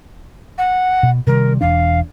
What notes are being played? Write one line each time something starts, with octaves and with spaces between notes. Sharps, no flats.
F#5
B2
C3 D#3 G3 A#4
E1 E3 D4 F5